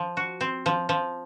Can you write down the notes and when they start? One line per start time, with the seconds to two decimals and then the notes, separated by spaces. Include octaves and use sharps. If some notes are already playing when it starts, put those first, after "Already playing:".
Already playing: F3
0.17 F#4
0.41 C4
0.66 F3
0.89 F3